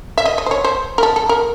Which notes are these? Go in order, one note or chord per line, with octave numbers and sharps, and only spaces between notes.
E5
D#5
D#5
C5
C#5
C5
A#4
A4
A4
A#4